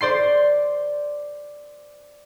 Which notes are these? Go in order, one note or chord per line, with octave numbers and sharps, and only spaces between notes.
C5 D5 C6 C7